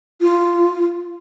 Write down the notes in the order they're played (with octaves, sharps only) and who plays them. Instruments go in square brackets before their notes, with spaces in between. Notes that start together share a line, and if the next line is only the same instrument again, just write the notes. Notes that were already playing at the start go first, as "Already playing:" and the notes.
[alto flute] F4